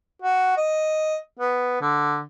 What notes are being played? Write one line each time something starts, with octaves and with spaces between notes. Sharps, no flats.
F#4
D#5
B3
D3